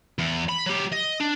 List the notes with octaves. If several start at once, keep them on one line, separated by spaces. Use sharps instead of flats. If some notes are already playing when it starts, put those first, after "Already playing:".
E2
B5
F#3 G4
D#5
D4